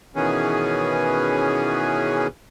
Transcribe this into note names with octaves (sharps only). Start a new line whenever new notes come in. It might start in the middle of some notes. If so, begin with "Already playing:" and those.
B2 D#3 E3 B3 C#4 G#4